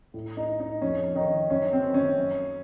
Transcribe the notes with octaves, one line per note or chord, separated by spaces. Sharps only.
A2
D#4
D#4
F2 C#4
D#3 D#4
F#2 C#4
C4
D#3
C#4
F#2